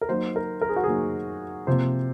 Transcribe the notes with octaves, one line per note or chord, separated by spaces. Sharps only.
A#4
F#3 A#3 D#4 C5
A#4
A#4
G#4
F#4
F#3 A#3 D#4 G#4
C3 F3 A#3 C5